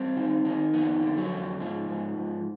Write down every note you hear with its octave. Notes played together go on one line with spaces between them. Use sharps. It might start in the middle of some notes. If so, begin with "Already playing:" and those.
Already playing: G2 C4
D#3
D#3
F2 B3
D3
F#3
F2
G#2 F3
G#2
G#2